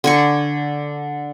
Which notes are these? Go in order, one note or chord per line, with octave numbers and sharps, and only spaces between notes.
D3 G#5 C#6